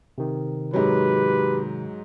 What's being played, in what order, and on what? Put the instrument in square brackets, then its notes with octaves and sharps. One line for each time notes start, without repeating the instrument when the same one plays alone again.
[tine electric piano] C3 D#3
[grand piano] G#2 F#3 [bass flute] G4 [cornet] B4